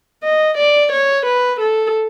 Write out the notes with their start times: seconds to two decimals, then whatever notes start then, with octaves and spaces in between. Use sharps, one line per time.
0.23 D#5
0.58 D5
0.92 C#5
1.26 B4
1.60 A4